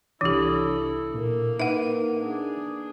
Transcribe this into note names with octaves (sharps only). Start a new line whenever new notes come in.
C2 E3 D4 E4 G4 A4 D#6
A#2 A#3 A#4
D#4 B4 E5 F#5
D4 G#4